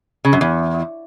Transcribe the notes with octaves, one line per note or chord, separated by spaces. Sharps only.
C#3
F#2
E2